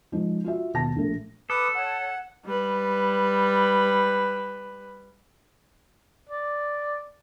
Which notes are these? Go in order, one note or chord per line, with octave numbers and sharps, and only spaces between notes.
F3 G#3 D#4
F4 F#4 E5
D#1 B2 A5 A#6
A#1 A3
A4 B4 D6 D#6
C#5 F#5 A5
G3 B4
D5